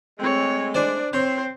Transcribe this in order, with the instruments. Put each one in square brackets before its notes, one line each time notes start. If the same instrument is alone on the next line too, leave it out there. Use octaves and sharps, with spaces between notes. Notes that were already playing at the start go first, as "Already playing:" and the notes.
[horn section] G#3 A3 [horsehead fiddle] C4 C#5
[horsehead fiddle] D4 [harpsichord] C5 D5 G#5
[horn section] C4 [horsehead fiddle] C5 [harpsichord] C#5